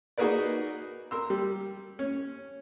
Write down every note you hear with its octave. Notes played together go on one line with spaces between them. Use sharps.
D#4 F#4 G#4 A#4 B4 D5
A#4 C6 E6
G3
C#4